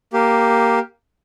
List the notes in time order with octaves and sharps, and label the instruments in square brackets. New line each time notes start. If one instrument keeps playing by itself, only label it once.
[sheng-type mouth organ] A#3 G4